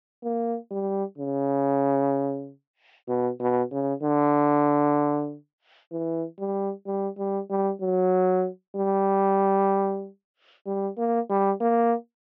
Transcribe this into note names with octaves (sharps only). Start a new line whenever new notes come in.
A#3
G3
C#3
B2
B2
C#3
D3
E3
G3
G3
G3
G3
F#3
G3
G3
A#3
G3
A#3